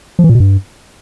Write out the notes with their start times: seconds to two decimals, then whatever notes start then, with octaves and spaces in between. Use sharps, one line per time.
0.19 F3
0.24 E3
0.29 A#2
0.35 B2
0.40 G2